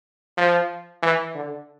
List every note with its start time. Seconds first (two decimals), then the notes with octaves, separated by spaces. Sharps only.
0.38 F3
1.03 E3
1.35 D3